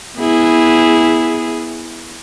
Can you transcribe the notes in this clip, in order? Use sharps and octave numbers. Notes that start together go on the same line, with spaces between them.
B3 E4 G#4